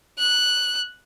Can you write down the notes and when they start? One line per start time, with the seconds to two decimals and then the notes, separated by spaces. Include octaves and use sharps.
0.19 F#6